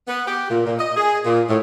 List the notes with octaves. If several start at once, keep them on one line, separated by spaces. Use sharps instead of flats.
B3
G4
A#2
A#2
D#5
G#4
A#2
A2